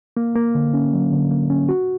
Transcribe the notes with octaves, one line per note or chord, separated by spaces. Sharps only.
A#3
A#3
D3
C#4
F#3
D3
A#3
C#4
F#4